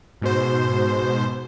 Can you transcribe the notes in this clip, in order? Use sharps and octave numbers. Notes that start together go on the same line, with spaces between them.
G#2 B2 C5